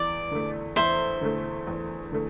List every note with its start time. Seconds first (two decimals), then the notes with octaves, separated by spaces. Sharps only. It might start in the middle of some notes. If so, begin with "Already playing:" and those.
Already playing: E2 D5
0.31 D3 A3
0.76 E2 C5 E5
1.21 D3 A3
1.67 E2
2.12 D3 A3